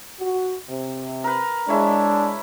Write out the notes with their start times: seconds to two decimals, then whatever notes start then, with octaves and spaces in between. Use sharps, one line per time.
0.20 F#4
0.69 C3
1.24 A#4 B4
1.69 G#3 D4 E4 C#5